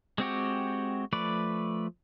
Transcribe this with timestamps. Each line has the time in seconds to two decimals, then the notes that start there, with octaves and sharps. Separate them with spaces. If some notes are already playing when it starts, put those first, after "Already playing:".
0.18 G#3 C4 F#4 G4
1.13 F3 A3 B4 D5